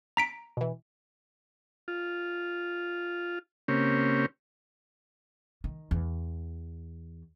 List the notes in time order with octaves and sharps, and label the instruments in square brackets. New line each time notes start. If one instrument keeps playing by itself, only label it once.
[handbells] A#5 B6 D7
[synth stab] B2 E3
[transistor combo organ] F4
C#3 A#3 C4 C#4 G4
[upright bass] D#3
E2